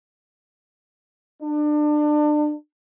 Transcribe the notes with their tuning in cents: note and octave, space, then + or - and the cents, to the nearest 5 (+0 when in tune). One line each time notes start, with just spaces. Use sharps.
D4 +30